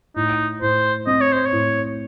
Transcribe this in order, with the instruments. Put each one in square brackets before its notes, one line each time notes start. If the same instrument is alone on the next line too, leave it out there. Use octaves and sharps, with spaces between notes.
[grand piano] A2 [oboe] D#4
[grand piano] A2 [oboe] C5
[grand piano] C4 [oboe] D#5
[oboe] C#5
C5
C#5
[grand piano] A2